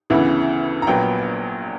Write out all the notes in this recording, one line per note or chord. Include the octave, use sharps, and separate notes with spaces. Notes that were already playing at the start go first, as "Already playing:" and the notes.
D2 C#3 E3 B3 E4
A#5
A#1 A#2 F#3 B3 G5